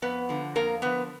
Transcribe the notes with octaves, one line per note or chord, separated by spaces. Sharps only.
F2 B3 B4
D3 F3
F2 A#3 A#4
D3 F3 B3 B4